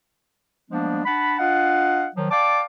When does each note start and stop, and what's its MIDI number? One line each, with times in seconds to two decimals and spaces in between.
0.71 1.03 53
0.71 1.03 55
0.71 1.03 56
0.71 1.03 58
0.71 1.03 59
0.71 1.03 62
1.05 1.35 62
1.05 1.35 78
1.05 1.35 81
1.05 1.35 83
1.39 2.07 62
1.39 2.07 65
1.39 2.07 75
1.39 2.07 77
1.39 2.07 78
2.15 2.29 51
2.15 2.29 53
2.15 2.29 54
2.31 2.61 74
2.31 2.61 77
2.31 2.61 79
2.31 2.61 81
2.31 2.61 86